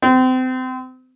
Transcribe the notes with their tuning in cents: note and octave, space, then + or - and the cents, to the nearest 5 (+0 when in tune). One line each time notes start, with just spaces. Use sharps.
C4 -30